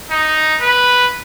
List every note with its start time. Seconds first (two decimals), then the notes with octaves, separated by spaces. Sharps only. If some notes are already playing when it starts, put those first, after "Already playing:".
0.11 D#4
0.61 B4